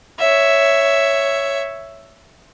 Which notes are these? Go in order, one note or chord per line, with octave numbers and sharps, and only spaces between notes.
C#5 E5